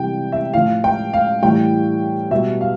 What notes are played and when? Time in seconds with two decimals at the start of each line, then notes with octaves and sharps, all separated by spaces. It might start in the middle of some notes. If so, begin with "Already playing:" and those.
Already playing: C3 E3 G3 G5
0.32 E5
0.53 A2 F3 F5
0.84 G5
1.13 F5
1.42 A2 E3 G3 G5
2.31 B2 G3 E5
2.61 F5